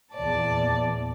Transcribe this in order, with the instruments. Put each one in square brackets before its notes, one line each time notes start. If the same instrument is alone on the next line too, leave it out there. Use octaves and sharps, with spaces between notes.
[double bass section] E2 A#2 [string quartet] D5 A5